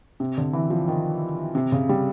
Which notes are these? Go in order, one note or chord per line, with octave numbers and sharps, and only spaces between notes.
C3
D3
E3
F3
D#3
C3
C#3
G3